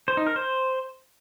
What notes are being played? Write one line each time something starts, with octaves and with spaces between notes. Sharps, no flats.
C5
D#4
A#4
C5